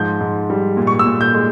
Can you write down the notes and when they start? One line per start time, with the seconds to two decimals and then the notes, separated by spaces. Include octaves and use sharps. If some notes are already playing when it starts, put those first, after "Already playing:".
Already playing: G#2 F3 G6
0.21 G#2
0.50 G3
0.77 A#2
0.87 C#6
0.99 E6
1.06 A#2
1.21 G6
1.34 G#3